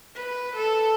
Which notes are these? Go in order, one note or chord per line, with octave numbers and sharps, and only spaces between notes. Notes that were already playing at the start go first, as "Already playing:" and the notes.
B4
A4